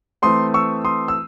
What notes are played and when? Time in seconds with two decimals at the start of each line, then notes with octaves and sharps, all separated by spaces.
0.22 E3 A3 C4 C6 D#6
0.54 C#6 E6
0.85 C6 D#6
1.08 E6